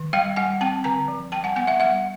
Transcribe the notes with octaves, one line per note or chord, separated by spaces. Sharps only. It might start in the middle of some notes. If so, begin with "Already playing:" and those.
Already playing: D#3
G3 F5 G5
G3 F#5 G#5
C4 G5 A5
D3 G#5 A#5
F3
G3 G5 A5
F#5 G#5
B3 F#5 G#5
E5 F#5
G3 E5 F#5